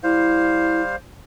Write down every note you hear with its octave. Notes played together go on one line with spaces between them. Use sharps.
G3 E4 C5 F5